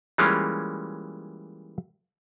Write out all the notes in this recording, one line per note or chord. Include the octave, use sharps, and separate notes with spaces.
E3 G3 G#3 A#3 C#4 F4